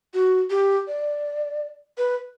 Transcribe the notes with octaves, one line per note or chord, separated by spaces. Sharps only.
F#4
G4
D5
B4